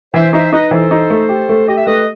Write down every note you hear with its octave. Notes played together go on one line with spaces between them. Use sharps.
E3 C5 E5
D#4 C5 E5
D#4 B4 D#5
E3 A4 C5
D#4
A3
G4
A3
G4 D#5
E5
A3 B4 D#5